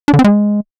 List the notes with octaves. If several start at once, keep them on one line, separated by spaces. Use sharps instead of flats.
D4
D3
C4
G#3